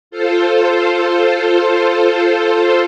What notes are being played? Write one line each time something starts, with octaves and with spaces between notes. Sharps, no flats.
F4 A4 C5